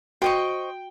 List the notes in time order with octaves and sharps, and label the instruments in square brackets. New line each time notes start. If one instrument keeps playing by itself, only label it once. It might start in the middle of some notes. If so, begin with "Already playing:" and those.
[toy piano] F#4 [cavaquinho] C5 D#5 C#6 [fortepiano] G5